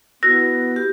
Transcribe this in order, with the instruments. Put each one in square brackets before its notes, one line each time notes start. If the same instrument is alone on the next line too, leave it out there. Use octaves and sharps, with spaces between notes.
[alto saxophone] B3 [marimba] E4 F#4 [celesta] A#6
[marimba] G4